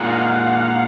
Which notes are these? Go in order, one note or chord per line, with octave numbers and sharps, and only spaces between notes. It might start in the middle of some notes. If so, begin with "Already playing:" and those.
Already playing: A#2 G#3 D#4 F5 F#5
F5